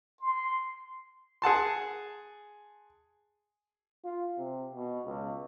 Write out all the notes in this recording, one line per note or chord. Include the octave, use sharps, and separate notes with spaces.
C6
G#4 F#5 A5 C6
F4
C3
B2
C#2